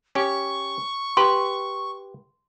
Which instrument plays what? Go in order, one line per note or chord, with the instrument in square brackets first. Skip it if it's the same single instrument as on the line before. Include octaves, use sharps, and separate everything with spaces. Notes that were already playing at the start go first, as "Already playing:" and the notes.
[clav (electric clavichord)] C#4 G4 [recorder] C#6
[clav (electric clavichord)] G4 B4 [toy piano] C6